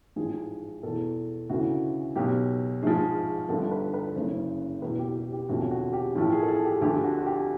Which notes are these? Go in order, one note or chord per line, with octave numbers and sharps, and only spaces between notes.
A1 G#2 F3 G#4
E2 B2 A4
D2 C#3 E3 F#4
B1 B2 G4
A#1 G#2 F3 G#4
G1 G2 D3 F3 A4
B4
B4
F#1 F#2 C#3 C5
E2 B2 B4
G4
G4
G4
E1 D2 C3 F3 F#4
F#4
G4
A1 A2 F3
G#4
A4
G#4
G4
D2 D3 F3 G4
F#4
F#4
G4